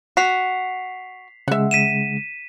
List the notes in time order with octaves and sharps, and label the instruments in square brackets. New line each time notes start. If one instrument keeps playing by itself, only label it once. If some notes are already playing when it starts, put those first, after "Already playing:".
[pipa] F#4 [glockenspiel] B6 C7 F7
[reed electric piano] C#3 G#3 [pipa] E5 F#5
[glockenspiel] B6 D#7 E7